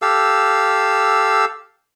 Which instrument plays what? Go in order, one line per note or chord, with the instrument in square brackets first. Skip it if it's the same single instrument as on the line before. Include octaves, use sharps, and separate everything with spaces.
[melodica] G4 A4 F5 E6